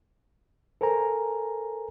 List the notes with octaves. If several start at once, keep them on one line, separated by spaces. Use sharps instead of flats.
A4 A#4 C5 G#5 A#5